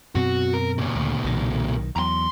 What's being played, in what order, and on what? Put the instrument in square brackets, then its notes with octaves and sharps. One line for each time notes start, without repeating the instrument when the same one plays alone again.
[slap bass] F#2 B2 C4 [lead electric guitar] F#4
[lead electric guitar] A#4
A#2 C#3
[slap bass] D2
B1 D#3
[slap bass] E2 F#3 [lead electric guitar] A#5 C6